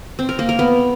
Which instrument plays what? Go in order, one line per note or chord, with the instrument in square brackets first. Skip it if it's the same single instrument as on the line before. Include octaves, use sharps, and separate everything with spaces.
[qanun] C4
A#4
A#3
A#4
B3